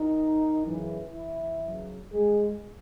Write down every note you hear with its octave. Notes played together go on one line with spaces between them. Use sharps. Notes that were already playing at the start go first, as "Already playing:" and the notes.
Already playing: D#3 D#4
F#2 C#3 E3
E3 E4
F#2 C#3 F#3
G#3 G#4